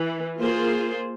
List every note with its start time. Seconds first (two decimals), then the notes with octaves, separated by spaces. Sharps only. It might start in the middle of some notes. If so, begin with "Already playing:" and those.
Already playing: E3
0.39 A#3 F4 G#4 C5